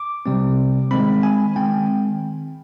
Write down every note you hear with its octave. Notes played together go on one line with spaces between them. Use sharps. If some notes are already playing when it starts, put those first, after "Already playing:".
Already playing: D6
C3 G3 C4
D#3 G#3 C4 B5
G#5
D#3 G#3 C4 G5